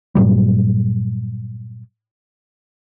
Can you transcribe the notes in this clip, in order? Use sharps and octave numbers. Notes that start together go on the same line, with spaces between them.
G2 A#2 F#3 G3